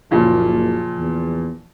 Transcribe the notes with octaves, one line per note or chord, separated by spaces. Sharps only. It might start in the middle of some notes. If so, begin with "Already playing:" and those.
F#1 A#2 C#3 F3
E2